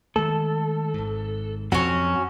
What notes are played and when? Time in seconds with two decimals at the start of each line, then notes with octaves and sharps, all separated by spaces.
0.16 D#3 G#3 A3 A4
0.94 G#1 G#2
1.72 F2 F#3 C4 C#4 F#4